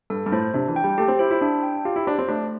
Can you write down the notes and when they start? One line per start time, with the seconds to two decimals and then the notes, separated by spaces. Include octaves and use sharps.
0.10 G2 A4
0.26 G2
0.32 A2 C5
0.54 C3 D4
0.68 E3
0.76 G5
0.84 G3
0.98 A3 G4
1.08 C4
1.19 E4 C5
1.31 E4
1.41 D4 E4
1.63 G5
1.85 F4 G4
1.96 E4
2.07 D4 C5
2.19 C4
2.28 A3 D4